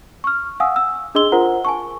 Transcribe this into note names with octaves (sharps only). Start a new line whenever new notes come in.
C#6 F6
F5 F#5 G#5 D#6 E6
E6
D4 G#4 D#5 C6 E6 G7
F4 A#4 C5 F#5 A#5
G#5 A5 C#6